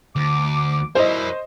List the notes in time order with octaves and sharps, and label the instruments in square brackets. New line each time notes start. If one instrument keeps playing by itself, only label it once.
[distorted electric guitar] D2 [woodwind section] D6
[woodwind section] B2 G3 E4 [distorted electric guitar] A#4 C#5 [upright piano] C5 D#5